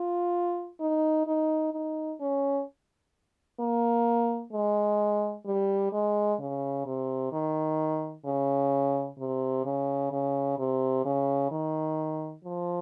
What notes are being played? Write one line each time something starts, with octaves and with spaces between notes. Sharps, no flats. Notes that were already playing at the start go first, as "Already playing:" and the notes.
Already playing: F4
D#4
D#4
D#4
C#4
A#3
G#3
G3
G#3
C#3
C3
D#3
C#3
C3
C#3
C#3
C3
C#3
D#3
F3